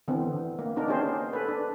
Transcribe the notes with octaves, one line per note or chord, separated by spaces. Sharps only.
D3 E3 B3 C4
A#3
B3 D4 D#4 A#4
C#4 D4 G4 G#4 C5
A4 B4
D4